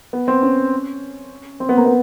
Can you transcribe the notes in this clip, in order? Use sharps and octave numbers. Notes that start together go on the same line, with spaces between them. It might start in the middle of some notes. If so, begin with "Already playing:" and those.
B3
C4
C#4
C4
B3
A#3
B3